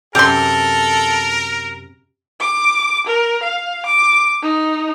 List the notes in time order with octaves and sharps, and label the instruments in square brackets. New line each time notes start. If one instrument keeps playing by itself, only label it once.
[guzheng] F#2 C3 [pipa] G4 C6 [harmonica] A4 [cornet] A#4
[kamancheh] D6
A#4
F5
D6
D#4